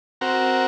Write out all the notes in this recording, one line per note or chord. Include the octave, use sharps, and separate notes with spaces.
C4 F#4 A#4